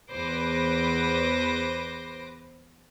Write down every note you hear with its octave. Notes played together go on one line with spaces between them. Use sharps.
E2 B4 C5 D6 A#6